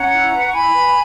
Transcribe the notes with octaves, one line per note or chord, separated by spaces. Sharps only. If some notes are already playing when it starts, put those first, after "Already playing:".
Already playing: C#4 F#5 A#5
E4
B4
C#6
E4 G#5 B5
B4